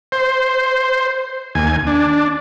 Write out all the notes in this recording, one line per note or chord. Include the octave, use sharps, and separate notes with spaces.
C5
D#2 G#5
D4